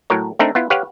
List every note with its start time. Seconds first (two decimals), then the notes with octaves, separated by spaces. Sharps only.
0.10 A2 F#3 A#4 C#5
0.39 A3 C4 D4 D#4 A#4
0.55 B3 E4 F4
0.70 G4 B4 C#5 F5 F#5